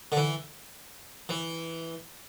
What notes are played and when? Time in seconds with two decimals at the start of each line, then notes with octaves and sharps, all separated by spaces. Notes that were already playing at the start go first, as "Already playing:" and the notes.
0.12 D3
0.17 E3
1.29 E3